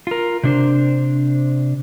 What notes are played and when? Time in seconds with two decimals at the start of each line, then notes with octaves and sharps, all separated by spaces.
0.07 F4 A#4
0.43 C3 D4 C5